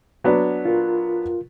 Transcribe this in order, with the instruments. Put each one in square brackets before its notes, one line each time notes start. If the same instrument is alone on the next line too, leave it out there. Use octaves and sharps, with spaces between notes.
[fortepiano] F#3 B3 D4
[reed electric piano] F4 A#4